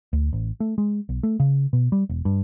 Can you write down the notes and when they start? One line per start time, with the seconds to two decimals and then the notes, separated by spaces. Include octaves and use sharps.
0.13 D2
0.33 A1
0.60 A3
0.78 G#3
1.09 B1
1.23 A3
1.40 C#3
1.73 B2
1.92 G3
2.09 E1
2.25 G2